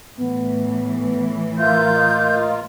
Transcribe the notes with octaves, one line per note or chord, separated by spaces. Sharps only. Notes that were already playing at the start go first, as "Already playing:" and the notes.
A2 E3 B3
A#3 F4 E5 G6
D#5